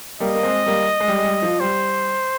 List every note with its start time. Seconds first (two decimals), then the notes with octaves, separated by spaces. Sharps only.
0.20 G3 A#3 D#5
0.35 A#3
0.43 G#3 C4
0.66 G3 A#3
1.00 G#3
1.08 G3
1.18 G#3
1.25 G3
1.42 F3
1.60 G3 C5